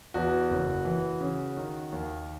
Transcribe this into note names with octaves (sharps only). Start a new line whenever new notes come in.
E2 F#4
F#1
E3
C#3
D#3
D#2